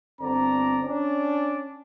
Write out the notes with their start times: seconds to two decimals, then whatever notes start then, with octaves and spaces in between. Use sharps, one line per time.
0.21 G1 D3 C4 D5 A#5
0.83 C#4 D4 D5